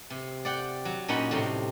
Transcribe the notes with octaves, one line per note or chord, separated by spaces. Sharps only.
C3
D5 F#5 G5
F#3
A#2 C#4 D#4 F#4 F#5 B5
A2 C3 G3 D#4